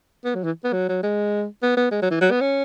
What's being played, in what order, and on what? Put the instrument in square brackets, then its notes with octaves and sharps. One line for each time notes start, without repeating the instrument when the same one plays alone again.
[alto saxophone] B3
F#3
E3
B3
F#3
F#3
G#3
B3
B3
G#3
F#3
E3
F#3
B3
C#4